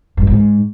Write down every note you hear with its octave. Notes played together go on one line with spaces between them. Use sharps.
G2
G#2